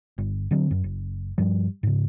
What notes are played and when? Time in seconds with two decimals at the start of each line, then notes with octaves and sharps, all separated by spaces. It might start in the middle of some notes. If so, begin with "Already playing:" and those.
0.18 G1
0.51 D3 F#3 C4
0.71 F#2
0.84 F#1
1.38 G2 F3 G3
1.83 G#2 C#3